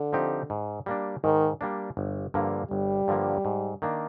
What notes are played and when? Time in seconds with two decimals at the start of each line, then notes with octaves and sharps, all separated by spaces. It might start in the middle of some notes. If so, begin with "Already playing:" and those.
Already playing: D3
0.13 F3 C4 D#4 G4
0.50 G#2
0.86 G3 A#3 D4
1.23 G#2 D#3
1.61 G3 A#3 D4
1.97 G1
2.34 G2 D3 F3 A#3
2.71 G1 G3
3.08 G2 D3 F3 A#3
3.45 G#2
3.82 D#3 A#3 D4